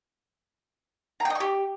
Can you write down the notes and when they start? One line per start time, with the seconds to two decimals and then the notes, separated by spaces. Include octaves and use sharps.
1.20 A#5
1.25 G5
1.30 D#5
1.35 C#6
1.40 G4